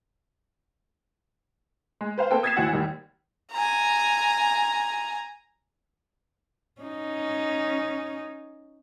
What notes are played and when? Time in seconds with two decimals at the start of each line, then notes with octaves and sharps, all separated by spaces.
2.01 G#3
2.18 B4 C5 F5
2.31 A#3 C4 A4 B4 G5
2.43 D#6 G#6 A6 B6 C7 E7
2.55 D#2 E3 F#4 F#5 G#5 E6
2.73 D#2 D#3 G3
3.52 G#5 A#5
6.82 C#4 D#4